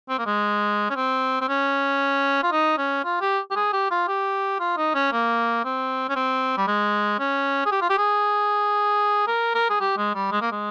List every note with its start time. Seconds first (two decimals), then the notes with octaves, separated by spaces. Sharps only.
0.09 C4
0.19 A#3
0.26 G#3
0.90 C#4
0.96 C4
1.41 C4
1.48 C#4
2.43 F4
2.52 D#4
2.78 C#4
3.04 F4
3.21 G4
3.51 G4
3.56 G#4
3.73 G4
3.91 F4
4.08 G4
4.60 F4
4.77 D#4
4.95 C#4
5.12 A#3
5.65 C4
6.09 C#4
6.16 C4
6.58 G3
6.68 G#3
7.19 C#4
7.66 G#4
7.72 G4
7.82 F4
7.90 G4
7.98 G#4
9.27 A#4
9.55 A#4
9.70 G#4
9.80 G4
9.97 G#3
10.15 G3
10.32 G#3
10.42 A#3
10.52 G#3